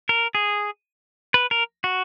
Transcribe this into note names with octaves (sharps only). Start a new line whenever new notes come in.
A#4
G#4
B4
A#4
F#4